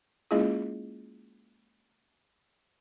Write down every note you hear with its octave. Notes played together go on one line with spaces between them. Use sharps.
G#3 A#3 C#4 E4 F4 G#4